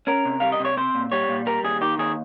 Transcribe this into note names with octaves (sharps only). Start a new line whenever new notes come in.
C#4 A#4
C3
G3 F5
D#5
C3
C#5
C4 C5
A#2
G3 C#5
A#2
G3 A#4
D#2 G#4
D#3 G4
D#2 G#4